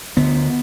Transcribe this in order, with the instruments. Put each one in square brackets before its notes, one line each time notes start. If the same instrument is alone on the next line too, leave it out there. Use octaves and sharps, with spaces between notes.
[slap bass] D2 D3 B3